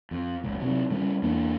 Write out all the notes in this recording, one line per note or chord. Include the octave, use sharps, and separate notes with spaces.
F2
F#1 C#2
C3 F#3
C#3 G3 C4 C#4
E2 A#3 D4